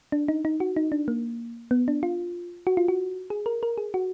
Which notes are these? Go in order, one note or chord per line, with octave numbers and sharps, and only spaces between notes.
D4
D#4
D#4
F#4
D#4
D4
A#3
B3
D4
F4
F#4
F4
F#4
G#4
A#4
A#4
G#4
F#4